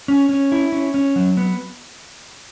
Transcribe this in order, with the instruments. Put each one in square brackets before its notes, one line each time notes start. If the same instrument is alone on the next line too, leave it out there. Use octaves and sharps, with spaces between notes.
[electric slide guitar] C#4
C#4
E4
C#4
C#4
F#3
B3